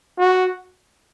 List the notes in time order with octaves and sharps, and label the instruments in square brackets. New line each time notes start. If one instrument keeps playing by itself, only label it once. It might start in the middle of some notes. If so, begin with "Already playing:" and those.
[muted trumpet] F#4